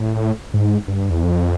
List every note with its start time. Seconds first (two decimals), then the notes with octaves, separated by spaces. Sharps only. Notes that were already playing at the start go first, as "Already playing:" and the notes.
Already playing: A2
0.54 G#2
0.88 G2
1.10 E2
1.23 F2